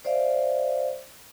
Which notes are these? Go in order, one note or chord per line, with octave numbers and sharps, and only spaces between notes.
C5 D5 E5 F5